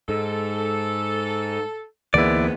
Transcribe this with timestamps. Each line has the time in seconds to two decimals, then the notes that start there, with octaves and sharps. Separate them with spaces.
0.09 G#2 A4
2.14 D2 G#2 E3 A#3 B3 E4 D5